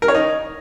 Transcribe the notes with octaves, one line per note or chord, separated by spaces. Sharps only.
A#4
C#5
D#4